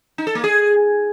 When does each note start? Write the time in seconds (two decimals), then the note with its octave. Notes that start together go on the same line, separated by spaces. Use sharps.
0.18 D#4
0.27 A4
0.35 A#3
0.44 G#4